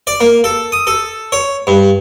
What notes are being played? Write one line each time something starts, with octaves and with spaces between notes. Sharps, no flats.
D5
A#3
A4
D#6
A4
C#5
G2